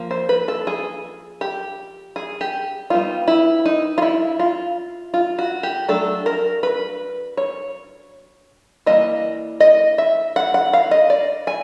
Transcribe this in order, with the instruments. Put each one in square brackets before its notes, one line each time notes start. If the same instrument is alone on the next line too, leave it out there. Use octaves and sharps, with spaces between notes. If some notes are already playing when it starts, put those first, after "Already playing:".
Already playing: [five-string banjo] F3 A#3
C5
B4
A4
G#4
G4
G#4
G4
G3 B3 D#4 F4
E4
D#4
F4
E4
F4
F4
F#4
G4
F#3 A3 D4 A4
A#4
B4
C#5
E3 G3 A#3 D#5
D#5
E5
F#5
F#5
F5
D#5
D5
G#5